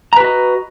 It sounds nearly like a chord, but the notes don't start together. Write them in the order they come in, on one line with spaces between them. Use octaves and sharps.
A#5 B4 F#4 D#5